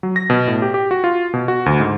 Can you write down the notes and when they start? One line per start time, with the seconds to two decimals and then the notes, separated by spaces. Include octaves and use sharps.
0.03 F#3
0.16 A#6
0.30 B2
0.47 A2
0.62 G4
0.74 G4
0.91 F#4
1.04 F4
1.34 B2
1.48 F#4
1.66 D2
1.80 G#2